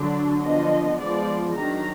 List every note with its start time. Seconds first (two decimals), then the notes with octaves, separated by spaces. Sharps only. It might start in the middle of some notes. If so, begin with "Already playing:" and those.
Already playing: D3 F#3 D4
0.42 D3 F3 B3 D4 D#5
0.99 F3 G#3 B3 D5
1.55 D#3 F#3 D4 A#5